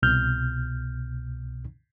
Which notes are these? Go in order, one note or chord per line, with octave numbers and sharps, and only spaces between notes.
C2 B2 F6 G6